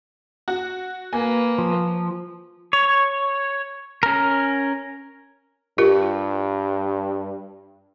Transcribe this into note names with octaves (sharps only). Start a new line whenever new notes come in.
F#4
A#3 B4 G#5
F3
C#5
C#4 A#4
G2 F4 G4 A#4